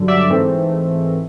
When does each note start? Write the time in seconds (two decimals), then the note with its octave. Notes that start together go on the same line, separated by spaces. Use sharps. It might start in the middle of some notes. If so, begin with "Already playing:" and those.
Already playing: G2 D3 F#3
0.08 D5 E5
0.30 G#2 E3 A3 C4